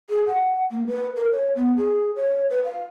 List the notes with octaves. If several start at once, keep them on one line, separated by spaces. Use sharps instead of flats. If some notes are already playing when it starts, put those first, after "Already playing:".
G#4
F#5
A#3
B4
A#4
C#5
B3
G#4
C#5
B4
F5